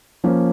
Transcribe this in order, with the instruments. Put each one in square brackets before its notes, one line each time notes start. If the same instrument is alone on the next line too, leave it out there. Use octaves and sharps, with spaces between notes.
[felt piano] F3 A#3 C#4